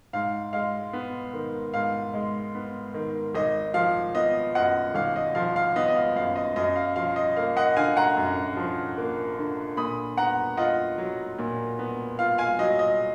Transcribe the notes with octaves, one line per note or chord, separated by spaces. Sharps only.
G#2 F5
G#3 F5
B3
D#3
G#2 F5
G#3
B3
D#3
G#1 D#5
F3 F5
B3 D#5
F#2 D#5 F#5
G#1 F5
D#5
F3 F5
F5
B3 D#5
D#5
F5
F#2 F5
D#5
F#2 D#5
F5
F3 F5
D#5
A#3 F5
D#5 F#5
D3 F5 G#5
F#5 A#5
F#2
F3
A#3
D3
A#2 B5 D#6
B3 F#5 A#5
F4 D#5 F#5
F#3
A#2
B3
F4 F5
F5 G#5
F#3 D#5
D#5